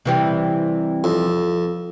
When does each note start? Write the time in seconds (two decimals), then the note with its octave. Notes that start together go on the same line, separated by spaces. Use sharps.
0.05 C3 E3 G3
1.04 F2